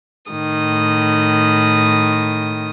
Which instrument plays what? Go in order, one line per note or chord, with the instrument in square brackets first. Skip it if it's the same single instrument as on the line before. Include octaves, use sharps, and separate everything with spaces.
[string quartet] A2 D#3 D#6